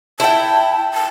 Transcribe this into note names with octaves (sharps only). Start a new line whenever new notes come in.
E4 G5 A5
A5